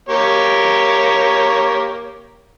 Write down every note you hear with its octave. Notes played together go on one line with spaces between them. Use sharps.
A#3 G4 C#5